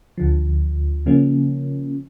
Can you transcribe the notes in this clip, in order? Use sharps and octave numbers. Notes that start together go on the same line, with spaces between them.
D2 D3 F3
C#3 F3 A#3 C#4